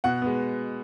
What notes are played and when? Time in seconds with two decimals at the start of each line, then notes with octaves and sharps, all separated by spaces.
0.04 B2 F#5
0.22 G#3 B3